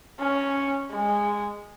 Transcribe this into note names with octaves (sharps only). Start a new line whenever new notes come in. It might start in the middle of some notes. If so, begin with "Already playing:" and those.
C#4
G#3